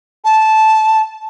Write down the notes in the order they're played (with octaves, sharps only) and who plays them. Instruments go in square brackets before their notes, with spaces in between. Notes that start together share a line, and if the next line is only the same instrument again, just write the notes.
[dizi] A5